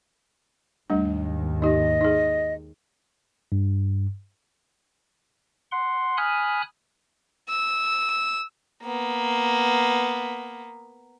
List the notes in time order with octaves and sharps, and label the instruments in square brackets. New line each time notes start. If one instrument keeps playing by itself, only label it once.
[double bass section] D#2 G#2 D#3 [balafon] G3 A3 D4
[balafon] D#4 G4 [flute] D#5
[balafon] D#4 G#4
[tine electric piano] G2
[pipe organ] F#5 C6
G#5 B5 D#6 F6 F#6
[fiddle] E6
[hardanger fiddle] A#3 B3